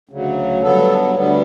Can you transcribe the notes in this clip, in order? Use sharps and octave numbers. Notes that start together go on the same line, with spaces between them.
D2 C#3 F#3
G2 F#3 B3 A4
D2 D3 G3 B3